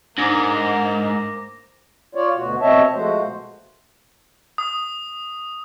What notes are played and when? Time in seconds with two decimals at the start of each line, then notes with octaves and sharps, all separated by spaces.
0.18 G#2 A#3 D4 C5 D6 A#6
2.15 F4 C#5 D5
2.35 D2 B2 F#4
2.61 B2 C4 C#5 D#5 E5 A5
2.94 F3 G#3 A3 F#4 C5
3.22 B2
4.58 D#6